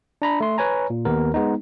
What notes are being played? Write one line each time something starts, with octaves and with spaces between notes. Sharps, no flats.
D4 A#5 B5
A3 C6
B4 C#5 G#5 A#5
A#2
D#2 B3 A#4
G#3 B3 D#4